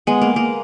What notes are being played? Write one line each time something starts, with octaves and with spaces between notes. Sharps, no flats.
G#3 B3
A#3
A#3